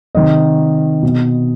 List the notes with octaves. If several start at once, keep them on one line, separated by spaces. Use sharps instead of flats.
C3 D#3 D#5
B2